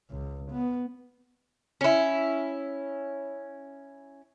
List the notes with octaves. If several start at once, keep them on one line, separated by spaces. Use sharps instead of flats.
C#2
B3
C#4 E4